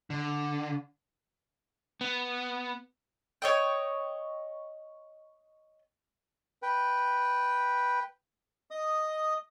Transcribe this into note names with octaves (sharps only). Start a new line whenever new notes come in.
D3
B3
C#5 D#5 G5
B4 G5
D#5 D#6